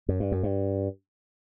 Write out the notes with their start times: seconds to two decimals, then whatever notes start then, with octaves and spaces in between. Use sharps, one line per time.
0.09 F#2
0.20 G2
0.32 F#2
0.43 G2